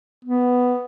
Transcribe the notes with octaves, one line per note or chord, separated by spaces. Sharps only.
B3